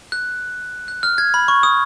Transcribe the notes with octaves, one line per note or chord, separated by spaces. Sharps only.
F#6
F#6
F6
G#6
B5
C#6
D#6